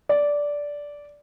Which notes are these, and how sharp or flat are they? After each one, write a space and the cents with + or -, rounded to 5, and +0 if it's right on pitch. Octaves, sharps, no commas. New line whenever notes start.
D5 -10